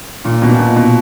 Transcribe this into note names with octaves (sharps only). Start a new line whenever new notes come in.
A#2
B2
A#2
B2
B2